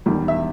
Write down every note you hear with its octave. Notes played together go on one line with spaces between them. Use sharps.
E1 E2 D#3 G3
E5